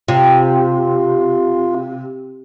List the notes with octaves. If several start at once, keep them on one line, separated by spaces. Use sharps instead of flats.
C3 F4